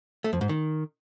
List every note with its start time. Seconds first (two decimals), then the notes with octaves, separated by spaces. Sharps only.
0.24 A3
0.33 F2
0.41 G#2
0.49 D#3